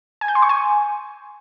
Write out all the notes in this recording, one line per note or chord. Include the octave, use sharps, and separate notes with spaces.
G#5
G6
C6
C#6
G#5